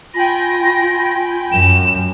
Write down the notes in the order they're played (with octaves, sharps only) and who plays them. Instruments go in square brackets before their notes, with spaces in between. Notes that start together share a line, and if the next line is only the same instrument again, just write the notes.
[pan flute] F4 [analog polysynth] G5 G#5 B5 [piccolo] A#6
[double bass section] F#2 [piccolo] E7